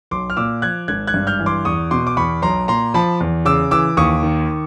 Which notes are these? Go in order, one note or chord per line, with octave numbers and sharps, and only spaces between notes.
B1 C6 D6
F6
A#2 D6 E6
F3 F#6 G#6
G#1 F#6 G#6
F#6 G#6
G2
F6 G6
E3
C6 D6
E2 C#6 D#6
B2 C6 D6
D6
E2 B5 C#6
B1 A#5 C6
A#2 A#5 C6
F3 A5 B5
E2
C#3 D6 E6
E3 D6 E6
D#2 C#6 D#6
D#3